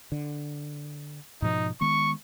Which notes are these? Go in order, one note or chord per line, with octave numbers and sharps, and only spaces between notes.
D3
G#2 B2 F3 D#4
D#3 G#3 B3 C#6